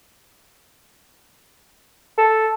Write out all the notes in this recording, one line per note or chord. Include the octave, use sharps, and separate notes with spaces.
A4